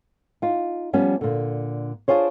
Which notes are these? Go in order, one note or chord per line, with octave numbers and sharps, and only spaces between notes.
D#4 F4
F3 G3 B3 C#4
A#2 D3
D4 F4 G#4 C5 C#5